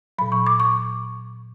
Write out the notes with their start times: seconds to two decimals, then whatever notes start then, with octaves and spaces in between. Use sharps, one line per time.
0.18 A#2 F#3 B5
0.32 C#6
0.47 D6
0.60 C#6